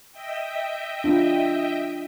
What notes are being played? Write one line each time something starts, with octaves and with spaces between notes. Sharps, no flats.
D#5 E5 G5
D4 F4